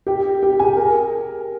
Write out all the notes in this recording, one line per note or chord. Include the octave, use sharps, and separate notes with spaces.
G4 G5
G4 G5
G#4 G#5
A#4